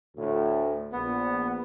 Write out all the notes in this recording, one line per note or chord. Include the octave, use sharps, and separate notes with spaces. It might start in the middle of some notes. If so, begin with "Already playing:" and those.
D2 A2
A#1 B3